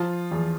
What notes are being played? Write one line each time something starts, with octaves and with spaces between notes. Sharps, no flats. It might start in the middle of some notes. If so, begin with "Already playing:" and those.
Already playing: F3 F4
E2